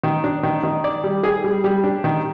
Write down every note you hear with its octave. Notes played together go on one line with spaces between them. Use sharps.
D#3
D4
D#3
D#3
D5
G3
G#4
G3
G3
D4
D#3